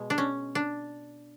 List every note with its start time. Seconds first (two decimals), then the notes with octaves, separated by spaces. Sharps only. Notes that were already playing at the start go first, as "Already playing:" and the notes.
Already playing: B2 G#3
0.10 D4
0.18 C#4
0.55 D4